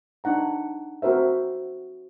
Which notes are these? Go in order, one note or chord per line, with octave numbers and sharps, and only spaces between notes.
D4 D#4 F#5 A#5
C4 F#4 A#4 C5 E5